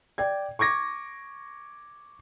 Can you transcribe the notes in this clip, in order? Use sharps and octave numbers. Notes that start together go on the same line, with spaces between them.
D5 G5 G#6
C#6 D6 G#6 A#6